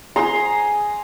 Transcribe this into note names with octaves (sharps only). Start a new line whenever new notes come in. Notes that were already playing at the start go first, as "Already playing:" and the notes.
G#4 A#5 C6